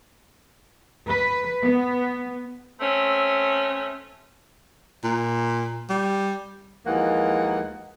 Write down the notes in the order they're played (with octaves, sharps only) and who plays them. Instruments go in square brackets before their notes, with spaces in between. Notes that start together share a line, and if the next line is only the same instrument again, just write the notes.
[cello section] B4
B3
[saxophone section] A3 C4 C#4
[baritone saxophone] A#2
G3
[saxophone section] D#2 E3 F3 G#3 A#3 F#5